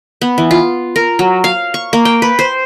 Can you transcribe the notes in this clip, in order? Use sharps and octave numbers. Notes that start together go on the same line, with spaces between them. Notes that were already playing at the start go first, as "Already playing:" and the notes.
B3
E3
F4
A#4
F#3
F5
C#6
A#3
G5
B4
C5